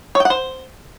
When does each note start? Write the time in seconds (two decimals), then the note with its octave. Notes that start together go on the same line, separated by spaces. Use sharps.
0.15 C#5
0.20 G5
0.25 F#5
0.30 C5